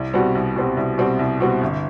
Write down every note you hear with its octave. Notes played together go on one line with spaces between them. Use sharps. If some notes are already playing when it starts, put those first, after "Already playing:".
Already playing: C2
B2 G3 C4 F#4
C2
B2 G3 C4 F#4
C2
B2 G3 C4 F#4
C2
B2 G3 C4 F#4
G1